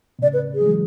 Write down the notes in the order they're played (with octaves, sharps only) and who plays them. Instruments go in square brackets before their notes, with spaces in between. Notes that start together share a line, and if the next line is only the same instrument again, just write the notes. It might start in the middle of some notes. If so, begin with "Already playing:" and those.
[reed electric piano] B2
[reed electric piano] A2 C#3 [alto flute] D5
[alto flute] B4
G#4
[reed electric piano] F#3
E3 G#3